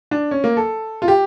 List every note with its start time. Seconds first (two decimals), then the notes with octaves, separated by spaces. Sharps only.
0.11 D4
0.31 C#4
0.44 A#3
0.57 A4
1.02 F4
1.08 G4